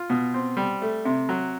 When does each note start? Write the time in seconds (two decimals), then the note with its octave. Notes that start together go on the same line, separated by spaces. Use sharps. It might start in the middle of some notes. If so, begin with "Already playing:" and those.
Already playing: F4
0.10 B2
0.34 C4
0.57 G3
0.82 A3
1.05 C3
1.29 F#3